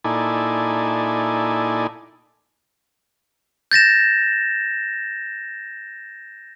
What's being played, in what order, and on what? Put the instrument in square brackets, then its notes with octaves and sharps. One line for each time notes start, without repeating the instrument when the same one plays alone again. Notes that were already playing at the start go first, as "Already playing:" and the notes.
[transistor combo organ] A#2 D#4 E4 A4 D5 G#5
[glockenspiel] G6 A6 A#6 E7